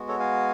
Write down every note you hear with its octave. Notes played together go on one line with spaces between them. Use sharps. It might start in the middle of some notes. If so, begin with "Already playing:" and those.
Already playing: G#3 B3 F#4
A4 C#5
F5 G#5